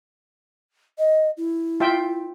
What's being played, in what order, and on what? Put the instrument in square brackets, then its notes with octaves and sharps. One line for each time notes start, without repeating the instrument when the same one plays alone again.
[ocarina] D#5
E4
[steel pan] F4 E5 G5